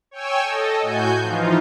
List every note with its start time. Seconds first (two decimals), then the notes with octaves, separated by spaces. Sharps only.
0.11 C#5 G5 G#5 E6
0.43 A4 D#5
0.81 A2 F#4 G#5 G6
1.22 E3 F3 D#4 F4